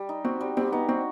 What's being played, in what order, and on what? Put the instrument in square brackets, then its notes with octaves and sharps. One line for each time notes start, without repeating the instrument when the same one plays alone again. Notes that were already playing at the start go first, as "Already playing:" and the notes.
Already playing: [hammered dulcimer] G3
D#4
[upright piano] C4 [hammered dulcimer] F#4
[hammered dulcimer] G3
[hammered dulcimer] G3 [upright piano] C4
[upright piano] B3 [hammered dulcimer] D#4
[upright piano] C4 [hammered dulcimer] F#4